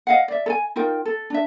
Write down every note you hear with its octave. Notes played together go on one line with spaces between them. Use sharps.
D#5 F5 F#5
D5 E5
A4 G#5
D#4 F4 A#4 G5
A4
D4 E5